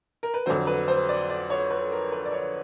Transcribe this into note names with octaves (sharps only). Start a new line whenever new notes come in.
A#4
B4
F2 D3 F#3 C5
B4
C5
D5
D5
C#5
B4
A#4
B4
D5
C#5